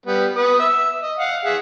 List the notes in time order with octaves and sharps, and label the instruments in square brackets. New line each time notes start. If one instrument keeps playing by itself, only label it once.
[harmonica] G3 B3
B3 B4 D#6
E5 E6
D#5
F5 F#5
G#4 E5 F#5